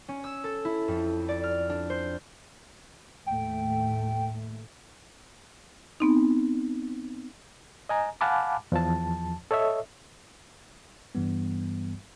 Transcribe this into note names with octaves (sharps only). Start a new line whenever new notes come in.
C#4
E6
A4
E4
F2
D5
F6
D4
C5
D#2 A2 A3 G5
B3 C4 D#4
D#5 G#5 A#5
F5 F#5 G#5 A5 B5 D6
E2 F3 A5
A4 C#5 D#5 E5
G2 E3 G3 B3